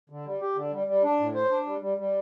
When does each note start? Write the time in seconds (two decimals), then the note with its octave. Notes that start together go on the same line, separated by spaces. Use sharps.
0.10 D3
0.25 G3
0.41 G4
0.56 D3
0.72 G3
0.87 G3
1.04 D4
1.20 A2
1.34 C5
1.51 D4
1.66 G3
1.81 G3
1.98 G3